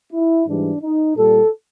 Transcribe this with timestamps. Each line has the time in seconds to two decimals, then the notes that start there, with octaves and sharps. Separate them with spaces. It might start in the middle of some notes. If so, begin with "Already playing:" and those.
0.12 E4
0.47 G#2 E3 G3 D4
0.82 D#4
1.16 A#2 G3 A4